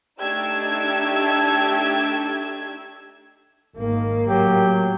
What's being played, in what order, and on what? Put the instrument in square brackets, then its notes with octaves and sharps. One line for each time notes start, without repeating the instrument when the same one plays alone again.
[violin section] A3 D4 D#4 G4 E6 G#6
[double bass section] G#1 D#3 [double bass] A#3
[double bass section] A2 [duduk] F#3 [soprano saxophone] G4